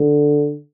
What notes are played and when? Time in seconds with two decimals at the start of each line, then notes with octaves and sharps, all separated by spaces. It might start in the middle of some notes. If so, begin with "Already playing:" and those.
Already playing: D3